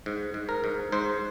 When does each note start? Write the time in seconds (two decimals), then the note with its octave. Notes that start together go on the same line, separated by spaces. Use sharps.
0.06 G#2
0.34 G#2
0.49 A#4
0.64 G#2
0.92 G#2 C5